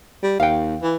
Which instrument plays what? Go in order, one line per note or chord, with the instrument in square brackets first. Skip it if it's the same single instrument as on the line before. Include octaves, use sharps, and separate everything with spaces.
[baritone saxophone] G3
[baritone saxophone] D#2 [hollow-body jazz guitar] F5 G5
[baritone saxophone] E3